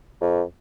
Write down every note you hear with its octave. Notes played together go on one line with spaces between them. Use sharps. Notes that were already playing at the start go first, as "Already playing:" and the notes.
F2